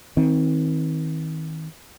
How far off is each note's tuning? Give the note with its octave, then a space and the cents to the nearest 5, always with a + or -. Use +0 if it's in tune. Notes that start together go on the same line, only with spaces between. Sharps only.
D#3 +35 C4 +0